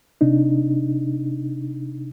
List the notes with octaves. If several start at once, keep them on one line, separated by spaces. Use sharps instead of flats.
C3 D4 D#4